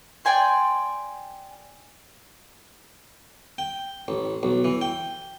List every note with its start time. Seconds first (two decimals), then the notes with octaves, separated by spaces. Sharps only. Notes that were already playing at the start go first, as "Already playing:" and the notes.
0.25 D5 G5 G#5 C6
3.58 G5
4.08 A1
4.43 B1
4.65 E3
4.81 G5